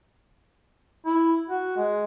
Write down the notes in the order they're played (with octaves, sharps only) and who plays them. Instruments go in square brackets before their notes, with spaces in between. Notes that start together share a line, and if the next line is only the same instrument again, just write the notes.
[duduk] E4
F#4
G#3